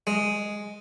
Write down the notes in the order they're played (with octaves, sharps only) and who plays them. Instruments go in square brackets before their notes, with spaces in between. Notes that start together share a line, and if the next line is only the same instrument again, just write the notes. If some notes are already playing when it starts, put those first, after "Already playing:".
[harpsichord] G#3